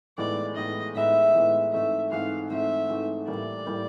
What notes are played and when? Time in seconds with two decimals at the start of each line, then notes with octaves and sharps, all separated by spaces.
0.18 A2 E3 G#3 B3 D#4 D5
0.56 A2 E3 G#3 B3 D#4 D#5
0.95 A2 E3 G#3 B3 D#4 E5
1.34 A2 E3 G#3 B3 D#4
1.73 G#2 E3 A3 C4 E5
2.11 G#2 E3 A3 C4 F5
2.50 G#2 E3 A3 C4 E5
2.90 G#2 E3 A3 C4
3.28 A2 E3 G3 A#3 D5
3.67 A2 E3 G3 A#3